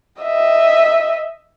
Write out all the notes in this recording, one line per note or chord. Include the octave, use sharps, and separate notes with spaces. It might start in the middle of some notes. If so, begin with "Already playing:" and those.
D#5 E5